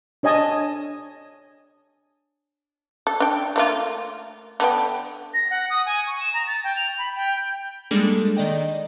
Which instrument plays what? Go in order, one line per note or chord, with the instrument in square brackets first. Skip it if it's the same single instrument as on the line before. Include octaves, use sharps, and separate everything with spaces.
[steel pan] D4 C#5 D#5 G#5 A5 D#6
[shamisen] A4
D4 G5
A3 A#3 F4
D3 B3 G5
[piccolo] A#6
F#5
D#6
G#5
C#6
E7
A#5
A6
G5
F7
B5
G5
[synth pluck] G3 G#3 A#3 D4 G#4 A4
D#3 D5 D#5 G5